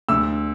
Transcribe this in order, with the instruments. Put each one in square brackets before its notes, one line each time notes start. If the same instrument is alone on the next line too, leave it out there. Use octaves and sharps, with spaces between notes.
[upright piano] D2 E6